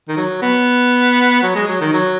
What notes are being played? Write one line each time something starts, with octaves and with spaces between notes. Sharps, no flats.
D#3
F#3
B3
F#3
G#3
F#3
D#3
F#3